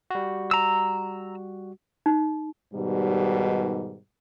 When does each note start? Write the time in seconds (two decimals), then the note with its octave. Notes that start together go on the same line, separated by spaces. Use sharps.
0.10 G3 F#4
0.51 A#5 E6
2.06 D#4
2.73 G#2 B2 D#3 G3